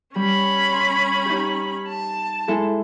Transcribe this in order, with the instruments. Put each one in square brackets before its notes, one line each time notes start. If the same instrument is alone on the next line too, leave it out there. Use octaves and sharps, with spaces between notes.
[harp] G3 [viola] C#4 B5
[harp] C6
D#4 G4
[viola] A5
[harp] G#3 E4 A4